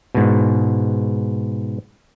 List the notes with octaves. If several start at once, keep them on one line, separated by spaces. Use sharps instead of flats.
G#2 B2